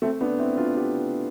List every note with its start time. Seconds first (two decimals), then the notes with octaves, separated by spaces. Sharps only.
0.02 A3 C4
0.21 B3 D4
0.39 C4 E4
0.57 D4 F4
0.76 E4 G4